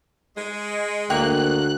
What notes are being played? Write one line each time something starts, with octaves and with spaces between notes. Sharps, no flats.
G#3
D2 A#3 A#4 G5 F#6